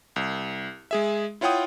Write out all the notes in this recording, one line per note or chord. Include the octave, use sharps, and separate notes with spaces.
C2
G#3 G#4 E5
E4 F4 C#5 F#5 G5 D#6